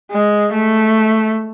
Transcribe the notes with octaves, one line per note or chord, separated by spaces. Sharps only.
G#3
A3